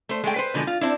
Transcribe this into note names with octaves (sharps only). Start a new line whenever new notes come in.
A3 C5
G#3 A3 G5
B4 C5
B2 D3 F3 G#3
F4
C4 D4 E4